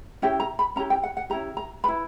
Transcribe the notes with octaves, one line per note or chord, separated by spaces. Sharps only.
C#4 E4 G4 G5
A#5
B5
C#4 E4 G4 A#5
G5
F#5
F#5
C#4 E4 G4 A#5
A#5
E4 B4 B5